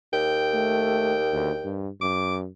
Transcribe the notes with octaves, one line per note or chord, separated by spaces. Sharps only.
D#2 G5
A3
D2
G2
F#2 D6